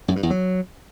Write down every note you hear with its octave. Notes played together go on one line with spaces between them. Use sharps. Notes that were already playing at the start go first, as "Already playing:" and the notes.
F#2
G2
E2
F#3